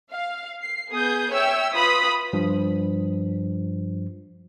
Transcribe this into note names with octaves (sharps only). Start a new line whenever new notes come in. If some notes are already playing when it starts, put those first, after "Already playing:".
F5
C7
B3 G#4 D#6 G6
C#5 E5 G5 E6
F4 B4 B5 D#6 B6
G2 F3